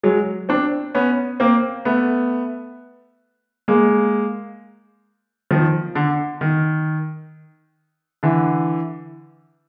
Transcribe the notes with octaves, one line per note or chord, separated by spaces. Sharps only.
F#3 G#3
C4 D4
B3 C#4
A#3 C4
A3 B3
G#3 A#3
D#3 F3
D3
D#3
D3 E3